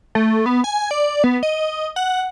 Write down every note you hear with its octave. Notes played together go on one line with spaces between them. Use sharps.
A3
B3
G#5
D5
B3
D#5
F#5